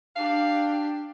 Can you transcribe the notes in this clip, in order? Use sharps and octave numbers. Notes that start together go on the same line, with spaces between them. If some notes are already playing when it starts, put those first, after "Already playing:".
D4 G4 F5